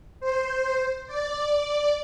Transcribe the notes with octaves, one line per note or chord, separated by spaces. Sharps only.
C5
D5